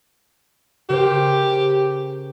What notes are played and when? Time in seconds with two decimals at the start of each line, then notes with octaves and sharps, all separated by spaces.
0.89 C#3 G4 A#4 C5